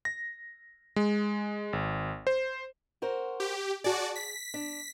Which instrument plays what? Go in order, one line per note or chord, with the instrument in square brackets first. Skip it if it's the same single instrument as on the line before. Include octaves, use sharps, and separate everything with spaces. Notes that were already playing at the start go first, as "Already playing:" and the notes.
[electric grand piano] A#6
G#3
G#1
C5
[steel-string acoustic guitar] F#4 A#4 C5
[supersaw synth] G4
[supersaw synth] F#4 D5 [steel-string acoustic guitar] G#4 A5
[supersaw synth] B6
[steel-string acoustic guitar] D4